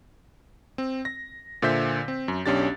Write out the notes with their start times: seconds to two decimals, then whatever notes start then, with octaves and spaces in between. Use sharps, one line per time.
0.78 C4
1.05 A#6
1.62 A#2 D3 C5 E5 G6 B6
2.08 C4
2.28 F#2
2.46 B1 C#4 D4 G4 A6